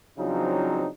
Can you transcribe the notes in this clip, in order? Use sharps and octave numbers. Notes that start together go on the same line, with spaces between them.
C#3 F3 F#3 C4 D4 D#4